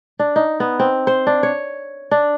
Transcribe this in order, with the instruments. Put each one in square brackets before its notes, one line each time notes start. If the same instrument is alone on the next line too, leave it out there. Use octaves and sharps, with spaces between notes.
[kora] D4
D#4
B3
C4
C5
D4
C#5
D4